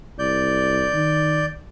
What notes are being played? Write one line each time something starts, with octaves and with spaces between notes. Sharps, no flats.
C2 D5 G6
D#3